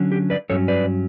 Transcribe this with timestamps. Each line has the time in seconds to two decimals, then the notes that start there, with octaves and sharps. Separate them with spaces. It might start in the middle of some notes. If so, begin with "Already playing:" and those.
Already playing: D3 F#3 C#4
0.12 G4
0.30 B4 D5
0.50 G2 F#3 C#4 A4 C#5
0.68 B4 D5